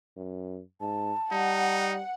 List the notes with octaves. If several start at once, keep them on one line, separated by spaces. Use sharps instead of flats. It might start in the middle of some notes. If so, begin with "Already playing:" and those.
F#2
G#2 A5
G3 D#4 F#5